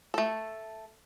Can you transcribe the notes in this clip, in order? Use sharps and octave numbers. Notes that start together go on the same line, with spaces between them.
A3 A4